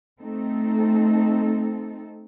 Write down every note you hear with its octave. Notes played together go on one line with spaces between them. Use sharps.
A3 C4 D#4 A4